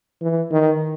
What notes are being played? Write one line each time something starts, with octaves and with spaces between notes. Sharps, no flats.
E3
D#3